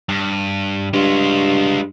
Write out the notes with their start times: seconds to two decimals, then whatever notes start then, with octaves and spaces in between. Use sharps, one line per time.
0.09 G2
0.93 G2 G#3 F4